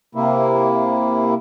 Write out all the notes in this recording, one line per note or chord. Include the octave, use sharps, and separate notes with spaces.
C3 A#3 E4